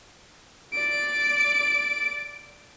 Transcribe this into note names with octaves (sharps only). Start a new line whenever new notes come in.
D5 D7